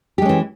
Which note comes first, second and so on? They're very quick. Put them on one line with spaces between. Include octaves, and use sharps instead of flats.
G4 G#3 C#4 E3